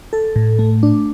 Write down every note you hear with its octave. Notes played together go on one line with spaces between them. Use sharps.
A4
A2
A3
D4